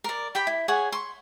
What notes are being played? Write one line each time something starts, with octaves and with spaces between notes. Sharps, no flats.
A#4 D5
G4 G5 B5
E4
G#4 C#5 F#5 G#5
C6 C#6